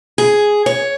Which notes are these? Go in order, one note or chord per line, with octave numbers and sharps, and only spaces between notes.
G#4
C#5